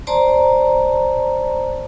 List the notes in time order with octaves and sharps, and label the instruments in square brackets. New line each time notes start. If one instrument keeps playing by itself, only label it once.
[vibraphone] C5 D5 A5 A#5 C6